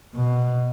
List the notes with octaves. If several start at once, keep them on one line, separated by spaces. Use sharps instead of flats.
B2